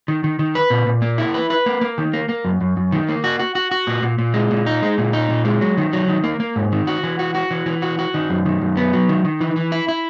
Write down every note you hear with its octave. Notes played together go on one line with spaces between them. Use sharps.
D#3
D#3
D#3
B4
A#2
A#2
A#3
E4
B4
B4
A#3
A#3
D#3
A#3
A#3
F#2
F#2
F#2
D#3
A#3
F#4
F#4
F#4
F#4
A#2
A#2
A#2
G#3
A#2
D#4
G#3
A#2
D#4
A#2
G#3
F#3
D#3
F#3
D#3
A#3
A#3
G#2
D#3
F#4
E3
F#4
F#4
E3
E3
F#4
F#4
D#3
F#2
D#3
F#2
B3
F#3
D#3
D#3
E3
E3
E4
E4